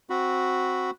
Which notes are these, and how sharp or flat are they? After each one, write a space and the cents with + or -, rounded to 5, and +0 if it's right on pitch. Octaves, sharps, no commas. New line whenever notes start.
C4 +0 F#4 -5 B5 +0